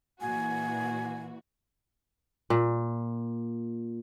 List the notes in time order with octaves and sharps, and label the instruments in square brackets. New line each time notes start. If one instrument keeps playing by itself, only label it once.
[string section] A#2 E3 F#4 [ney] G#5
[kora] A#2